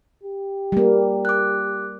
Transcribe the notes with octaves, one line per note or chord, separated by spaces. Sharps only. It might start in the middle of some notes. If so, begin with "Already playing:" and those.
G4
G3 A#3
D6 F#6